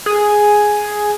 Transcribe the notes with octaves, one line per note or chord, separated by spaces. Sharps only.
G#4